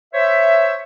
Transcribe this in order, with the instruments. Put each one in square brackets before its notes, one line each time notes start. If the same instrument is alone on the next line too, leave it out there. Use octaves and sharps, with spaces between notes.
[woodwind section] C5 C#5 E5